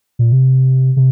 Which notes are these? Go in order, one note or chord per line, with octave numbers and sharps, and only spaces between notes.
A#2
C3
C3